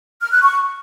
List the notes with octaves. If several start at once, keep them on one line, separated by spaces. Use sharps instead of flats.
F6
F#6
C#6